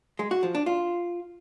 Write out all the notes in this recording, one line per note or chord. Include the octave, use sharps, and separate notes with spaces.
G#3
F#4
F3
D4
F4